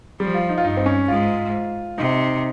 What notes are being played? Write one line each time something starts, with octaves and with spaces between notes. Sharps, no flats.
F3 G3
F4
D#4
F4
G2 D#4
C4
C#4
G#2 F4
C3 D#4